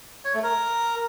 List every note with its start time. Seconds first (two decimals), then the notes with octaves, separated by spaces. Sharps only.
0.25 C#5
0.34 A3
0.43 A#4